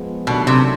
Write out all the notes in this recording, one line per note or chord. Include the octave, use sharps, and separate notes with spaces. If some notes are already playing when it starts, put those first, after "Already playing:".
Already playing: F3 G#3 B3
B2 D#3 F#3 A3 D4 G4
C3